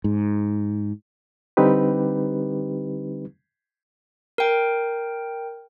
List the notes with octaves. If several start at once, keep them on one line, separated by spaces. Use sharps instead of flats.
G#2
D3 G3 C4 D#4 G4 B4
A#4 G5